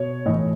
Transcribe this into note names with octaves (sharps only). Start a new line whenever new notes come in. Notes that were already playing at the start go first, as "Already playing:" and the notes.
Already playing: B2 C#5
A2 E3 D#5